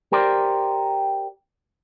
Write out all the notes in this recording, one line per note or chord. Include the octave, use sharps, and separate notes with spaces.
G4 A#4 C5 D5